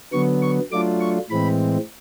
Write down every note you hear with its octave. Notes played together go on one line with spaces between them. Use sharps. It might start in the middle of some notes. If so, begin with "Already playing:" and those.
D3 F#3 B3 C#6
C#6
F#3 A3 D4 F4 D6
C#6
A2 E3 G#3 C4 B5